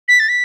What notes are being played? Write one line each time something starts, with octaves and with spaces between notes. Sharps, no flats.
B6
A6
B6